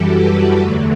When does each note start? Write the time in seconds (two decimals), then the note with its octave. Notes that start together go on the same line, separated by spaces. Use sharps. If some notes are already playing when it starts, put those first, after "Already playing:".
Already playing: F#2 E3 G3 F#4 G4 A4
0.11 G4 B4
0.60 E2 D3 F#3 A3